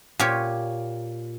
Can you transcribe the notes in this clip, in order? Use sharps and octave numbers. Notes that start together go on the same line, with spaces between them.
A#2 G4 C#5